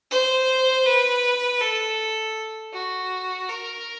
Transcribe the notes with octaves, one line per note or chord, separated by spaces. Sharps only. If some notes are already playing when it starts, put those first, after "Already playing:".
C5
B4
A4
F#4
A#4